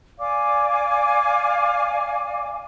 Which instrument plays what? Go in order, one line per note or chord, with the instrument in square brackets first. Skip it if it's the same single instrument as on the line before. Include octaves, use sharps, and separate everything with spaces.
[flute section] D5 F5 G#5 D6